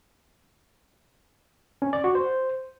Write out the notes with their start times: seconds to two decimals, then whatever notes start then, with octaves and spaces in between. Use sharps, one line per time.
1.82 C#4
1.93 D5
2.04 F#4
2.15 C5